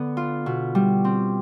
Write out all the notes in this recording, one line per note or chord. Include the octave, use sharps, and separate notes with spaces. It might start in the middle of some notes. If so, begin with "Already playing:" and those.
Already playing: D3 B3
F4
B2
G3
C4